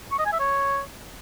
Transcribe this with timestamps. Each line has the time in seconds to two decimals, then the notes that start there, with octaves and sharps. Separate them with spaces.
0.12 C#6
0.19 D#5
0.26 G#5
0.33 E5
0.40 C#5